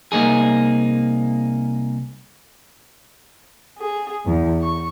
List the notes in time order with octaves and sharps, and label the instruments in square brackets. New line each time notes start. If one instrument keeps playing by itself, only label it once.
[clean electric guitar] C2 A#3 D#4 G#4
[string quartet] G#4
E2
C#6